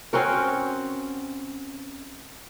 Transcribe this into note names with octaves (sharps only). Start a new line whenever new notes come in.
C4 C#4 F#4 A#4